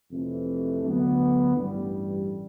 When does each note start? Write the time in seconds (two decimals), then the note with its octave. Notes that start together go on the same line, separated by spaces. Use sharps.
0.10 F2 C3 E3 A3
0.83 D2 D3 F#3 B3
1.56 A1 G2 E3 G3